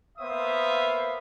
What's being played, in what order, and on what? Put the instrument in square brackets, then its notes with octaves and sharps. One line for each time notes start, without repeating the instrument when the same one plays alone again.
[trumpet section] A#3 B3 C5 E5 F5 D#6